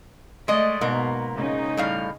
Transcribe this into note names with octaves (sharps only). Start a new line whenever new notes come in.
G#3 A3 D5 D#5
G#2 B2 A#3
C#3 D#4
A2 G3 F5